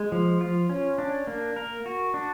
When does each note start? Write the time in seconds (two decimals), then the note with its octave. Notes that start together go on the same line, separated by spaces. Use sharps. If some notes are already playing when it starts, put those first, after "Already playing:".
Already playing: G#3
0.12 F3
0.41 F4
0.70 C#4
0.98 D4
1.27 A#3
1.56 A#4
1.86 F#4
2.14 D4